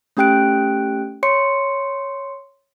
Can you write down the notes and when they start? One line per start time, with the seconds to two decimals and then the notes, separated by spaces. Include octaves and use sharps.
0.17 A3 C#4 G4 G5 F#6 D7
1.23 C#5 C6 C#7